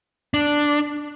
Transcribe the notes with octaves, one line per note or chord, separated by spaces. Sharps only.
D4